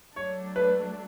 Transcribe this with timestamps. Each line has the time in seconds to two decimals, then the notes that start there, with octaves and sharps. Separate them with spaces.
0.16 F#3 A3 D4 C#5
0.56 B4